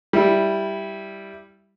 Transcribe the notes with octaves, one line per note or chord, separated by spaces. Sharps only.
G3 E4